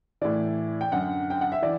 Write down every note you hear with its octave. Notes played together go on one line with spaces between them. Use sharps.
A2 E3 D5
G5
F#2 D3 F#5
G5
F#5
E5
E3 D5